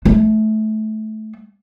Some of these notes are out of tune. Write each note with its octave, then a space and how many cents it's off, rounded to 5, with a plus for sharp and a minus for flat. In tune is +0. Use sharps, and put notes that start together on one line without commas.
A3 -20